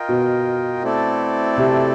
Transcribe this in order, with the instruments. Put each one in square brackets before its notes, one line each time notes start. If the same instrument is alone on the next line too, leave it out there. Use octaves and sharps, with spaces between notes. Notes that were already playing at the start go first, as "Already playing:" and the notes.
Already playing: [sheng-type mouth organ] F4 A#4 D#5 G5
[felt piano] B2
[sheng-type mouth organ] A3 C4 E4 A4 D5
[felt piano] C3